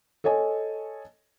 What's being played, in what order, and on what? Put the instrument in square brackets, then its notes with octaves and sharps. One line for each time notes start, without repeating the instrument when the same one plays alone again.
[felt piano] A4 C#5 D#5 G#5